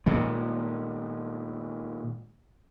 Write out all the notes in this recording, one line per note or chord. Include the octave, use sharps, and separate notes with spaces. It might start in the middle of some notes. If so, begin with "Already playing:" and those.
A#2 D#3 G#3